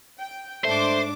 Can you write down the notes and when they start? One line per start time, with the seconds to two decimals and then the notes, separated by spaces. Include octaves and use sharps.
0.18 G5
0.64 G#2 A3 D4 C5 D6